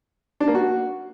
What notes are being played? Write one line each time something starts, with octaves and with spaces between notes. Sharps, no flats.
D4
A#3
F#4